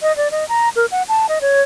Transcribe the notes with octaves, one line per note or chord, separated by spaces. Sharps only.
D#5
D5
D#5
A#5
A#4
F#5
A5
D#5
C#5